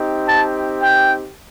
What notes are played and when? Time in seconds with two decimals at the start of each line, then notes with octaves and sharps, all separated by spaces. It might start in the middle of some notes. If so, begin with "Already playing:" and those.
Already playing: C4 D#4 G4
0.27 A5
0.80 G5